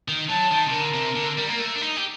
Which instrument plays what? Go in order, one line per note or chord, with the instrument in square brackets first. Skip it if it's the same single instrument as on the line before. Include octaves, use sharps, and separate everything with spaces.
[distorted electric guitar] D#3
[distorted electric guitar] F#3 [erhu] A5
[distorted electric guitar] D#3
C3
[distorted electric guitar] D3 [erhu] A#4
[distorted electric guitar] C3
D3
G3
A#3
A3
D4
D#4
G4